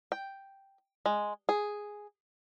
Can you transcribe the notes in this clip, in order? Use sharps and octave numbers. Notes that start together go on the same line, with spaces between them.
G5
G#3
G#4